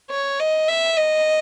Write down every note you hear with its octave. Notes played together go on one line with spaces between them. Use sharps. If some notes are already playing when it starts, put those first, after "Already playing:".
C#5
D#5
E5
D#5